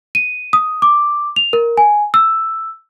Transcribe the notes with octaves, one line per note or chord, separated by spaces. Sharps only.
D#7
D#6
D6
F7
A#4
G#5
E6